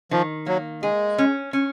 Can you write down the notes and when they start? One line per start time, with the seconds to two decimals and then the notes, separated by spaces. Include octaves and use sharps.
0.11 D#3 F3
0.47 F#3 A#3
0.82 G#3 G#4
1.18 C#4
1.53 C#4